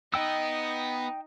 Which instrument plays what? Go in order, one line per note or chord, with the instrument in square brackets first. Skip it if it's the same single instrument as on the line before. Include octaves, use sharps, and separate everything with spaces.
[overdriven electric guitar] B3 [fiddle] D#4 [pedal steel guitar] D#5 G5 E6